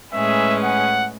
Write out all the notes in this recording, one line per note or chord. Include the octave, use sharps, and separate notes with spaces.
A2 G#3 C#4 G#4 B4 E5
F#5